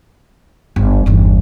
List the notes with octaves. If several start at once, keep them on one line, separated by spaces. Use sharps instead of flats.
G1
G1 E2